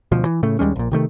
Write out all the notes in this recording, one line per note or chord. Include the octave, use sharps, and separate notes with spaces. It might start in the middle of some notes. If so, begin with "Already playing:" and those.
D2 B2 F3
E3
A2 C#3 A3
D#2 G3 G#3 C#4
A#1 A#2
C3 D#3 A3